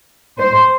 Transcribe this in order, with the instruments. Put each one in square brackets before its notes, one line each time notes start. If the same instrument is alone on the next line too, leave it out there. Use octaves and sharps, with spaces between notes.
[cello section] C5